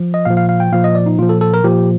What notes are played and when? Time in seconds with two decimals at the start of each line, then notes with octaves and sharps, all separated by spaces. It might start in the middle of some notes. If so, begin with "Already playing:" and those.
Already playing: F3
0.14 D#5
0.25 A#2 F3 F5
0.37 F5
0.49 F5
0.60 G5
0.72 A#2 F3 F5
0.84 D#5
0.95 D5
1.06 D#4
1.18 A#2 F3 F4
1.29 A4
1.41 A4
1.54 A#4
1.64 A#2 F3 G4